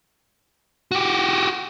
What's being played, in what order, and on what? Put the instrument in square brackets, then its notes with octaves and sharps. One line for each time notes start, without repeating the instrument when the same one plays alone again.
[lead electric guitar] F#4 G4